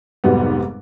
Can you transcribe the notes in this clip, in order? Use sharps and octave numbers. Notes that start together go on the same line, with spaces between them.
F1 G#2 F#3 G3 B3